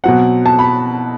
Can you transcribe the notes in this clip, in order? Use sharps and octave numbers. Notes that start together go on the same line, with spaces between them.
B2 F#3 C4 F#5
A5
B5